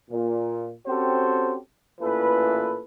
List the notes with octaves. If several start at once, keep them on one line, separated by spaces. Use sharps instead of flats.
A#2
C4 C#4 F#4 G4 A4 C5
A1 A#2 E3 A4 B4